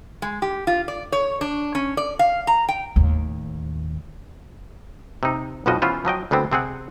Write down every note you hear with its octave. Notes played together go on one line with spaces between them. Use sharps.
G#3
G4
F4
D5
C#5
D4
C#4
D5
F5
A#5
G5
D#2 A2
C3 D#4
B1 F2 B2 F3 F#4 D#5
E3 B3 C#4 F4 C5
F3 F#3 D#5 G5
D2 D3 B3 C4
C3 C4 G#4 F#5